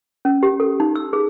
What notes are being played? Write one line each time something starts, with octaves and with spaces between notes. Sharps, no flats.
C#4
G4
A4
D#4
E6
G#4